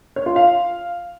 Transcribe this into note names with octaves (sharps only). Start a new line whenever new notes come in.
C#5
F4
F5